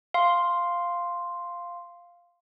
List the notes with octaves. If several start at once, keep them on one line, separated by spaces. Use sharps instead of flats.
F5 C6